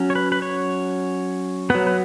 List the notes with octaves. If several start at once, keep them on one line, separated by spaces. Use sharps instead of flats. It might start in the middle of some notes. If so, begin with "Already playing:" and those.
Already playing: F#3 C#4
C#5
B4
B4
C#5
F#3 B3 B4
B4